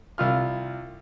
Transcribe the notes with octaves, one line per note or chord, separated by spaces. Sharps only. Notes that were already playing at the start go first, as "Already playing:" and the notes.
C2 F4 F6